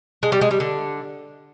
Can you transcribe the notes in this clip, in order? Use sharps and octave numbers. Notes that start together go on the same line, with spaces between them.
G#3
G3
G#3
G3
D3